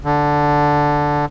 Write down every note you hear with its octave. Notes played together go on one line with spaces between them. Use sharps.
D3